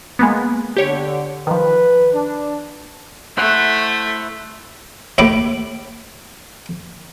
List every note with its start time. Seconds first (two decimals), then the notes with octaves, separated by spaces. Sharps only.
0.19 G#3 A#3 B3
0.77 D3 G4 C#5
1.47 D#3 F3 B4
2.13 D4
3.37 A3 E4 C5 F#5
5.18 D#2 A2 E5 B5 D6